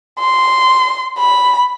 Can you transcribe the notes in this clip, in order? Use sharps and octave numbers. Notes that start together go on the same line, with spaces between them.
C6
B5